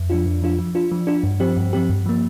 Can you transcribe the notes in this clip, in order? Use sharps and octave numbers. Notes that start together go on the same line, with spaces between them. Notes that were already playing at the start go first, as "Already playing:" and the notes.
Already playing: F2
F3 D4 F4
F2
F3 D4 F4
F3
D4 F4
F3
D4 F4
G2
F3 C4 G4
G2
F3 C4 G4
G2
F3 A#3